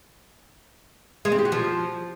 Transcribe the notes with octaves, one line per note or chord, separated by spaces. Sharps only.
G#3
C4
G4
F#4
F3